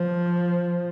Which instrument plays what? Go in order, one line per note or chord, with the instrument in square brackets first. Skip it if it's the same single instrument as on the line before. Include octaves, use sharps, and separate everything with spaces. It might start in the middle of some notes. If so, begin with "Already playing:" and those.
Already playing: [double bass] F3